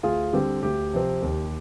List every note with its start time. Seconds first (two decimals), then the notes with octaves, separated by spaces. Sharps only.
0.03 D2 F4 G#4
0.33 D3 G3 C4 G4
0.63 D2 G4
0.93 C3 F3 C4
1.22 D#2